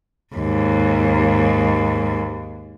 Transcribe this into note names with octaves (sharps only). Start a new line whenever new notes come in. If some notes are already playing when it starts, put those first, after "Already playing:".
D#2 G#2